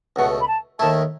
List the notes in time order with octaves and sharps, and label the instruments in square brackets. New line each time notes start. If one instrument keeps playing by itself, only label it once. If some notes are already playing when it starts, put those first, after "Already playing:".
[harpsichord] C#2 B2 A3 [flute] F#5
[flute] B5
A5
[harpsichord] D#2 D#3 A3 E4 [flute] A5